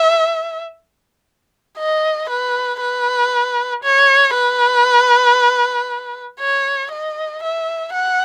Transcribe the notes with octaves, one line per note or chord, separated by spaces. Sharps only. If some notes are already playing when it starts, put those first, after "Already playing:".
Already playing: E5
D#5
B4
B4
C#5
B4
C#5
D#5
E5
F#5